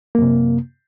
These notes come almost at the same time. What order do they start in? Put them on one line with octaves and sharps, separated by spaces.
A#3 F#2 C3